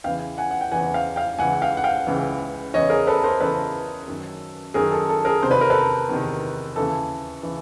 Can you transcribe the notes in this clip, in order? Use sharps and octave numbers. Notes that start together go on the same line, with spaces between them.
E2 C#3 E3 F5 G5
F#5 G#5
F#5
G5
E2 C#3 E3 F#5 G#5
F5 G5
F5 G5
C#2 C#3 E3 F#5 G#5
F5 G5
F#5
F5 G5
C#2 C#3 E3
E2 C#3 E3 C#5 D#5
G#4 A#4
A4 B4
A#4 C5
E2 C#3 E3 A4 B4
F#2 D#3
F#2 D#3 G#4 A#4
A4
A4
G#4 A#4
E2 C3 D#3 C5
B4
A#4
A4 B4
E2 C3 D#3
D#2 C#3 E3 A4
C#3 E3